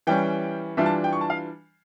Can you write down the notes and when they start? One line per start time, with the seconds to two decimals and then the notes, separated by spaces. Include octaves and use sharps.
0.07 E3 G3 C#4 G5
0.77 E3 G3 D4 F4 E5
0.86 A5
1.04 G5
1.13 C#6
1.21 A5
1.30 F5